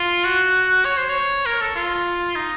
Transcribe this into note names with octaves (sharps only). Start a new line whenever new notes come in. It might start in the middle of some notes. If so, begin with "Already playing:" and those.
Already playing: F4
F#4
C#5
C5
C#5
A#4
A4
F4
D#4